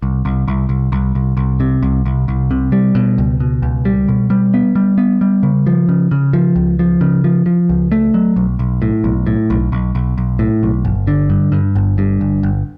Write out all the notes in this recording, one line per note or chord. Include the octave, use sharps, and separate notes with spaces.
C2
C2
C2
C2
C2
C2
C2
C3
C2
C2
C2
C3
G3
B2
C#2
B2
C#2
G3
B2
G3
B3
G3
B3
G3
C#3
F3
C#3
C#3
F3
C#2
F3
C#3
F3
F3
C#2
A3
F#3
B1
B1
A2
B1
A2
B1
B1
B1
B1
A2
B1
G1
D3
G2
G2
G1
G2
G1
G1